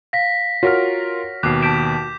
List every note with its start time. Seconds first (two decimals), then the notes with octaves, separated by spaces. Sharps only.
0.13 F5 A#6 B6
0.63 F4 F#4 A#4 C#5 F6
1.43 D#2 B2 D6 F#6 C7
1.62 A5 G6 B6 D7 E7